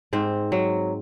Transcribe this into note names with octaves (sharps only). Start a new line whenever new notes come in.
G#2 C4
F#3